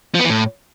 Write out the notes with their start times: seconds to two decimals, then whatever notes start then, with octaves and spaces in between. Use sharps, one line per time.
0.15 F3
0.20 B3
0.25 E3
0.30 A2